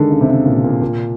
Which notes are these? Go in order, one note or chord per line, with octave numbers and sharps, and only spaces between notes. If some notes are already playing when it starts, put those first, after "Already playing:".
Already playing: D3 D#3 F#3 G#3
C#3
C3
C#3
A#2
A#2
A#2